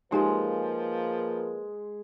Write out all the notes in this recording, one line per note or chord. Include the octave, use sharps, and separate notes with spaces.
F3 G#3 A#3 D#4 G4 A#4 B4 G#5